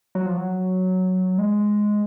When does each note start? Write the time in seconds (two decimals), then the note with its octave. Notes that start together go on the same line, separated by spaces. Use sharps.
0.15 F#3
0.26 F3
0.37 F#3
1.38 G#3